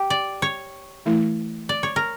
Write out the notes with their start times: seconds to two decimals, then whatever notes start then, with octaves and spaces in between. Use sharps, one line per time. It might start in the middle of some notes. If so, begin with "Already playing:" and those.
Already playing: G4
0.10 D5
0.42 C#5
1.06 E3 A3 E4
1.69 D5
1.83 C#5
1.96 A#4